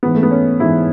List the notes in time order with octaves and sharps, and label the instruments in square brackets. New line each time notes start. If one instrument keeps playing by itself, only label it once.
[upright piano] G#2 E3 B3
A3
B3
C#4
G#2 E3 E4